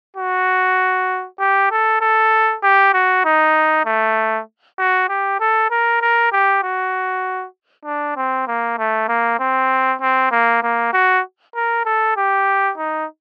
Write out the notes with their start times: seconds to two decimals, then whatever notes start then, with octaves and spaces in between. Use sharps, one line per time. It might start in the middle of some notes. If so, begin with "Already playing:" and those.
0.16 F#4
1.39 G4
1.71 A4
2.01 A4
2.63 G4
2.93 F#4
3.25 D#4
3.85 A3
4.78 F#4
5.09 G4
5.40 A4
5.71 A#4
6.02 A#4
6.32 G4
6.63 F#4
7.85 D4
8.16 C4
8.48 A#3
8.78 A3
9.08 A#3
9.40 C4
10.02 C4
10.31 A#3
10.63 A#3
10.93 F#4
11.55 A#4
11.85 A4
12.17 G4
12.78 D#4